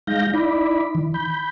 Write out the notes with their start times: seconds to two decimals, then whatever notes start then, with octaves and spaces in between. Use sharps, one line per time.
0.07 G#3 D#4 F5 G6 A#6
0.34 D#4 E4 D5 B5
0.95 D#3 E3
1.14 B5 G6